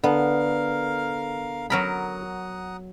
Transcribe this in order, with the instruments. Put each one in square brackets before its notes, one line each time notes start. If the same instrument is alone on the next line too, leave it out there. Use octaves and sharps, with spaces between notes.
[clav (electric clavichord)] D3 [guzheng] B3 [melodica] A#4 F5
[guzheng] F#3 A#4 B5 [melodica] F#5 A#5 D#6